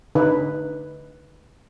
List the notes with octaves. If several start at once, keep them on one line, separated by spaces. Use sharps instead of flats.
D3 D#4 B4